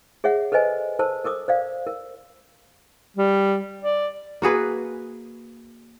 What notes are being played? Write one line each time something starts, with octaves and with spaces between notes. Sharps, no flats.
G#4 C#5 E5 F#5
A4 B4 C5 D#5 G#5
A4 A#4 C5 A5
A4 A#4 D6 D#6
C5 D5 F5
A#4
G3
D5
A#3 F#4 G#4 B4